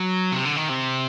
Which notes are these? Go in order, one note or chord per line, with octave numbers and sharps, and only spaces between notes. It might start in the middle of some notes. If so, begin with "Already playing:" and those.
Already playing: F#3
C3
D3
D#3
C3